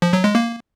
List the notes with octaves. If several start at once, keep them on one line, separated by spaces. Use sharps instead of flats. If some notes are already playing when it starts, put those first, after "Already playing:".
F3
F#3
G#3
A#3